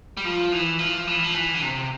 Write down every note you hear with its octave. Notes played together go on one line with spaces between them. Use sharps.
G3
F3
E3
F3
E3
F3
E3
D3
C3